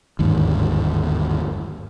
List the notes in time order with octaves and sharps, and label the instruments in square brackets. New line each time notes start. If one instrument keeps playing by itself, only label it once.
[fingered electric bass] G1 D#2 G#2